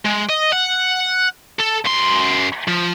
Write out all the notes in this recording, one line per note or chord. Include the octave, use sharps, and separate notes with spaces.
G#3
D#5
F#5
A4
F#2 C6
F3